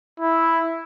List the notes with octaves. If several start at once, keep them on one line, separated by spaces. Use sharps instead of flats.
E4